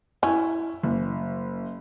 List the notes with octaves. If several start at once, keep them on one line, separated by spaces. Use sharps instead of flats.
C#4 E4
F#1